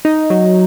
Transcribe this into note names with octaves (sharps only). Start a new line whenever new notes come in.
D#4
F#3